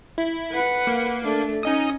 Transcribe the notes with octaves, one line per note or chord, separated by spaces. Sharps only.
E4
B4 F#5
A#3
A3 D4
C#4 D#4 D#5 D#6